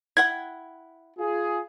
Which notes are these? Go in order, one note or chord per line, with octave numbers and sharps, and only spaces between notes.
E4 F#5 G5 G#6
F4 G#4